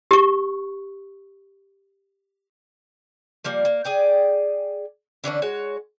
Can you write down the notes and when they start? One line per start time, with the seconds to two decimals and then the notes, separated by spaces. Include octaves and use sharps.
0.11 G4 C#6
3.45 F3 G3 A#3
3.65 A#3
3.85 G#4 D5 G5
5.24 D3 E3 C#4 D4
5.42 G#3 F#4 C#5